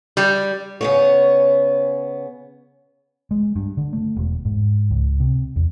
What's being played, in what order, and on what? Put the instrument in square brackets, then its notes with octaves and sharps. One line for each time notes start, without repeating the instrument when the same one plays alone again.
[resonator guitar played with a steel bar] G3
[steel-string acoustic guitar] C#3 B3 C#5
[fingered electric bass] G#3
G2
D3
A3
E1
G#2
C#2
C3
E2